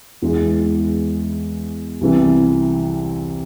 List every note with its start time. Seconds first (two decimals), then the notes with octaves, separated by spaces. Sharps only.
0.22 E2 E3 G#3
2.01 C2 C3 E3